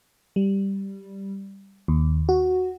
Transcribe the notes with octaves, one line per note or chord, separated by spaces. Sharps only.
G3
D#2
F#4